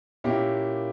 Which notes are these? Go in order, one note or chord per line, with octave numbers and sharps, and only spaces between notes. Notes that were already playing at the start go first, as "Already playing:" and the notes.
A#2 A#3 C#4 E4 G4